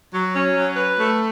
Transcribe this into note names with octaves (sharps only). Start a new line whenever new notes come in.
F#3
C#4
F#3
B4
A3